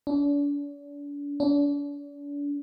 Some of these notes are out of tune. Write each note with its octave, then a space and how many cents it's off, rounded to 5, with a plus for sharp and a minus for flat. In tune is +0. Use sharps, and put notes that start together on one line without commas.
D4 -40
D4 -40